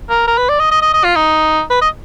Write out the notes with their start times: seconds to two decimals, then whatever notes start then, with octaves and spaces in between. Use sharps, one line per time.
0.10 A#4
0.27 A#4
0.38 B4
0.49 D5
0.60 D#5
0.71 D#5
0.82 D#5
0.94 D#5
1.04 F4
1.16 D#4
1.70 B4
1.82 D#5